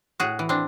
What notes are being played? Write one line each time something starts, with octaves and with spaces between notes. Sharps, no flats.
A2 F#4 G#4
E3
C4 D4